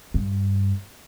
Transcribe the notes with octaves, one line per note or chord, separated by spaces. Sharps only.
G2